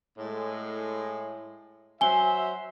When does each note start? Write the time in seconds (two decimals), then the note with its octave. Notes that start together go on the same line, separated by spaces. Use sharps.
0.18 A2 G#3
2.01 F#3 C5 E5 G#5 G7